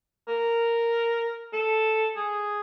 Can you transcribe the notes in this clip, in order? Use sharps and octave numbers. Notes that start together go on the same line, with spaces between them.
A#4
A4
G#4